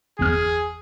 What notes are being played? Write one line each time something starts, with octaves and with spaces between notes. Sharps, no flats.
G1 E2 G#4 F6